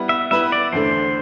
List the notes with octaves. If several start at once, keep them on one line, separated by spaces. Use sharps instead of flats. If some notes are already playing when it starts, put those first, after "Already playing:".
Already playing: G3 B3 E4 B4
E5
G3 B3 E4 B4 E5
D5
E2 D3 A3 C5